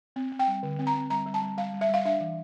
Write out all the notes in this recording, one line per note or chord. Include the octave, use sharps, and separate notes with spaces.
C4
C4
G5
G3
D3
C4
A#5
C4
G3 A#5
G3
A5
G3
G3 F5
G3
E5
G3 F5
D4 E5
E3